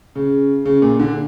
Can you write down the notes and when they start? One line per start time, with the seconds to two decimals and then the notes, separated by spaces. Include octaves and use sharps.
0.15 C#3
0.65 C#3
0.82 A#2
0.99 D3